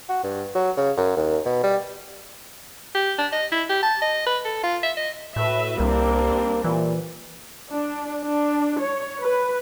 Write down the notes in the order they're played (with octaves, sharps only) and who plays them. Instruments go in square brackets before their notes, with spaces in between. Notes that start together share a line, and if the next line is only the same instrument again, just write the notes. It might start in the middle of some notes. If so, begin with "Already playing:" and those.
[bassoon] F#4
G2
F#3
C#3
F#2
D#2
B2
G3
[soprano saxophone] G4
D4
D#5
E4
G4
A5
D#5
B4
A4
F4
E5
D#5
[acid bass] A2 [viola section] F#4 B4 E5
[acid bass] C2 [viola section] G3 C4 D4 [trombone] A#3
[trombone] A#2 [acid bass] E3
[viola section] D4
D4
C#5
B4